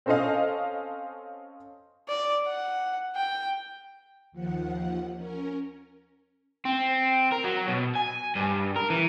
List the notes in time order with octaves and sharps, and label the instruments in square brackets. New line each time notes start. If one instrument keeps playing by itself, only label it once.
[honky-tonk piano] C4 C#4 A4 C5 D#5 F5
[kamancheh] D5
F#5
G5
[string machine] D#2 F3 F#5
C#4 A#4
[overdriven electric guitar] C4
A#4
F#3
B2
G#5
G2
A#4
E3